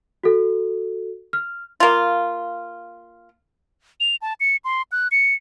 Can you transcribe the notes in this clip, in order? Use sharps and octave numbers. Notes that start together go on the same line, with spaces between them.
F#4 A4
F6
A#3 F4
F7
A5
C#7
C6
F#6
C#7